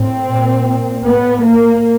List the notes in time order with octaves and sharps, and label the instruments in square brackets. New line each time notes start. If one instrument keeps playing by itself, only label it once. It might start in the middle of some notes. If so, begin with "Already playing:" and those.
Already playing: [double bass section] A2 C4
A#2
A2 B3
A#3